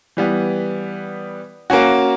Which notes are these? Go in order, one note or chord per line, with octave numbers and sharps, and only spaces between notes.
E3 G3 B3
A#3 C#4 F#4